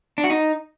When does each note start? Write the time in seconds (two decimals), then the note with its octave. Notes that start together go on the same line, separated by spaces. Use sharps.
0.18 D4
0.24 F#4
0.30 D#4